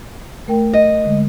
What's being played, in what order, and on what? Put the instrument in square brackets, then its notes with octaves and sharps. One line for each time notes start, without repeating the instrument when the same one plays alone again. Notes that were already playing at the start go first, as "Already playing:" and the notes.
[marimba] A3 A#4 G5
[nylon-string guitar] D#5
[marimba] D3 G#3